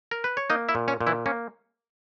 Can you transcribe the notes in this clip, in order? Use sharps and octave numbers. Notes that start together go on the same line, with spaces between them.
A#4
B4
C#5
A#3 D#4 D#5
E4 E5
A#2
C#4 C#5
A#2
E3 E4
A#3 C#4